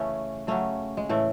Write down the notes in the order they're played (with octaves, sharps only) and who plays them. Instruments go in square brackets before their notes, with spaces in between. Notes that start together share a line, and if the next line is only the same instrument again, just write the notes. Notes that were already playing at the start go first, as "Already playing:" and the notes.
Already playing: [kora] C#3 E3 A3 C#4
C#3 F#3 A3 C#4
G#3
A2 E3 A3